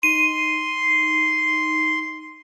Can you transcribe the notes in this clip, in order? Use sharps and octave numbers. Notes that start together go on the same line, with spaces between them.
D#4 C6 D#7